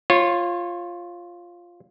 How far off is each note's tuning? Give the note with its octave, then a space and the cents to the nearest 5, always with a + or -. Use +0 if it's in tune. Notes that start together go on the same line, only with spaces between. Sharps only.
F4 +0 C#5 -30